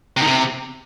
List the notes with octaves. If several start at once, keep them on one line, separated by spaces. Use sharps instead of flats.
C3
D#3
C3